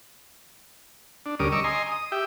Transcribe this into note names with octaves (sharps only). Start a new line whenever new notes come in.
D4
D2 G3 C#4 A#4 D6 D#6
D#5 A#5 C#6 D6 E6
D#5 G#5 A#5 C6
D#6
G4 E5 G5